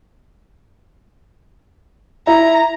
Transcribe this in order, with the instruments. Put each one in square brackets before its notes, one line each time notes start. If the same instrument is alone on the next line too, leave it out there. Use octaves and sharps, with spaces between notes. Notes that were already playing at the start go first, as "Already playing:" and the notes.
[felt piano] E4 [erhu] A#5